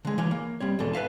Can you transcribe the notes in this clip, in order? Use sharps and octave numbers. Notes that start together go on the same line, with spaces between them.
D3 G#3
E3 C#5 F5
A#3
G3 C4 C#5
E2 G#2 B2 A4
B4 E5 F5 A5